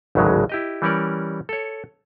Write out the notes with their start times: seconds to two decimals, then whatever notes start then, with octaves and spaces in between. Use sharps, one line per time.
0.15 G#1 D2 A2 C#3 F#3 G#3
0.49 E4 G4 D#5
0.82 E3 G3 C#4 A#4 D5
1.49 A4 C#5